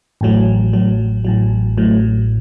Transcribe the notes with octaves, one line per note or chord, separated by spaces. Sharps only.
A1 A2 F#3
A1 A2 F#3
A1 A2 F#3
A2 F#3